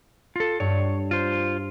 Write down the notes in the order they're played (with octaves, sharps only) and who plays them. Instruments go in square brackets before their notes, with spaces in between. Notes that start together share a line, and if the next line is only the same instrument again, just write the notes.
[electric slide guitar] F4 A4
[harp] G2 [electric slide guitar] C#5
[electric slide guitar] F4 C5